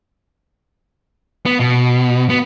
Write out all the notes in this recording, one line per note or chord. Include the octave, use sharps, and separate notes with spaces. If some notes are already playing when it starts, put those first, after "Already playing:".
B3
B2
B3